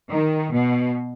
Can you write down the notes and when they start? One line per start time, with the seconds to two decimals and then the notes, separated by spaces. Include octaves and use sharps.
0.12 D#3
0.53 B2